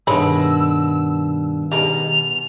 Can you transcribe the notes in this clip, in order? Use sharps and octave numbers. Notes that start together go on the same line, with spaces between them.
G2 B2 D#3 G#3 C#5 B5 E6
B2 G3 G#3 D#4 F7